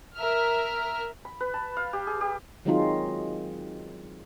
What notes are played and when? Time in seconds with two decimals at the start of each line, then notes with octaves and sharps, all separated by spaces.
0.17 A#4 E5 F6
1.25 B5
1.40 B4
1.54 A5
1.77 F5
1.93 G4
2.07 G#4
2.21 G4
2.65 D#3 F#3 G#3 C4 D#4 F4